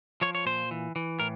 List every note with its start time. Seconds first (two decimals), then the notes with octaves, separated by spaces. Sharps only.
0.21 F3 C#5
0.35 C#5
0.46 A#2 C5
0.71 E3
0.96 E3
1.20 A2 A#4